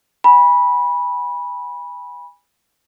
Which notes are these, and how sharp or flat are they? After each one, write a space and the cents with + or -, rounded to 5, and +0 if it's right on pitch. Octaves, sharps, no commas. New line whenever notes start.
G#5 -25 B5 -15